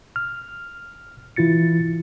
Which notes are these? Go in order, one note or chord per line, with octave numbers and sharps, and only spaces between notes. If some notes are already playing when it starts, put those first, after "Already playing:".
F6
E3 E4 F4 A6 C#7